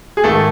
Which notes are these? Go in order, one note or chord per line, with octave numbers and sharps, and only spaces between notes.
G#4
G#2 D#3 A3 A4